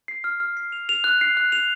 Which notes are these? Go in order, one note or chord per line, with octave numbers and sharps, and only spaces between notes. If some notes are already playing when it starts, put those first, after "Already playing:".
C7
F6
F6
C7
F7
F7
F#6
C7
F#6
F7